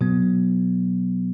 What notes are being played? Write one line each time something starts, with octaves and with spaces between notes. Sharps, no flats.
B2 F#3 B3